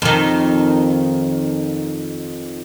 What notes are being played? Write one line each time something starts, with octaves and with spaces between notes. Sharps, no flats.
F2 D#3